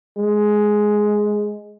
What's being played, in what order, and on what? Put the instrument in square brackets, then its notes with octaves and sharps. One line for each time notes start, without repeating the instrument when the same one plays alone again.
[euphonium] G#3